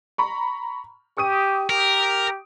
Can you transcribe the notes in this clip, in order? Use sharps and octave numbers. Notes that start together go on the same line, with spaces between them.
A#5 B5 C#6
G4 C#6 D#6 D#7
G4 A#4